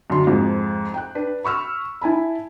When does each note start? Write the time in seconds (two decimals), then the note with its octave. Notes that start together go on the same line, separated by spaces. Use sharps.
0.10 F#2 D3 C6
0.27 F2 G#2 F3
0.94 G5 F#6
1.15 D4 B4
1.44 B5 C#6 E6 F6
2.01 E4 G#5 A5 B5